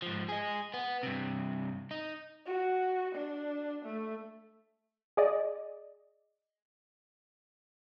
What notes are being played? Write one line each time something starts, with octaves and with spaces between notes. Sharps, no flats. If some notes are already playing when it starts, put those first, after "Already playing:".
G#2 F3
G#4 D#5
B3
G2 C3
D#4
F#4
D4
A3
G#4 D5 D#5